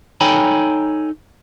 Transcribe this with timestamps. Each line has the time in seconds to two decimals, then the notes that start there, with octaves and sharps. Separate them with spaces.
0.21 D#4 A4 C#5 G5 G#5 B5